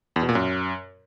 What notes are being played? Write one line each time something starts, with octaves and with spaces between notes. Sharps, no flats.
E2
B2
A#2
F#2